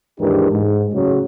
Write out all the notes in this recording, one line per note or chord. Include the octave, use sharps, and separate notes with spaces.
D#2 G#2 E3 D4 G4 A#4
G#2
A1 C#3 F#3